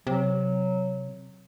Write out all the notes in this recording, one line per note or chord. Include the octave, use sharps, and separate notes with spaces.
C3 F#3